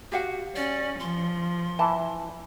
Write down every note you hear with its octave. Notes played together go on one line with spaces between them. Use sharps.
F#4 G4 F5 F#5
C#4 D5
F3 C6
E3 A5